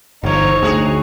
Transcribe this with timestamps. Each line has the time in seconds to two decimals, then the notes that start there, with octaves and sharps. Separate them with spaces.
0.23 G1 C3 E3 D#4 C#5
0.63 D2 F#4 G#4